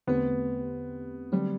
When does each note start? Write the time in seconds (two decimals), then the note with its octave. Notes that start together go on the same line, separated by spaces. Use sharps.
0.07 E2 D3 A3 B3 C4 G4
1.32 D3 F#3 G3 A3 C4